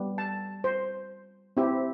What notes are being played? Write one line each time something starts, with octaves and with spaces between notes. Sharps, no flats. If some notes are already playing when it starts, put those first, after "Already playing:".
Already playing: G3 B3
A5
C5
C4 E4 G4